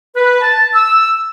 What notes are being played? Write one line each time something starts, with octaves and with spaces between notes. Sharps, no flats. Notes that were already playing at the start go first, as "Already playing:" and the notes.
B4
A5
E6